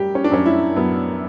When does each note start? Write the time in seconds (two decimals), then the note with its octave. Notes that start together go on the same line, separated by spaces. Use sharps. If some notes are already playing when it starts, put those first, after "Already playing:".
Already playing: F#2 G3 G4
0.15 C#4
0.24 D4
0.31 F#2 C#4
0.46 E4
0.76 F#2 B3